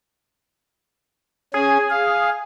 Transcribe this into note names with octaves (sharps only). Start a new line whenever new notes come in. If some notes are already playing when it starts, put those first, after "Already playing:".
C#4 G#4 G#5
F5